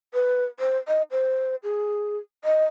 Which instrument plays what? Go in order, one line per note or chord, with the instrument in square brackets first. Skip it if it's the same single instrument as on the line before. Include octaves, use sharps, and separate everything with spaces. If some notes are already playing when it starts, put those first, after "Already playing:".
[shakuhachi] B4
C5
D#5
C5
G#4
D#5